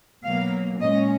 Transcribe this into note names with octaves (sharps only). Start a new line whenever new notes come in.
B2 F#3 A#3 F5
A#2 G#3 C#4 D#5